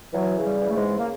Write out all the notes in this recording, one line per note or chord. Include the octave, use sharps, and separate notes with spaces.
E3 F#3
C#3
G3
E3
A3
G#2 G#3
C#3
A#3